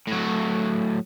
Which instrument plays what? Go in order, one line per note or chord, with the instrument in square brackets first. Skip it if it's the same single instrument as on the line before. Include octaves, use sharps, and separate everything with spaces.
[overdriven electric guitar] A2 F#3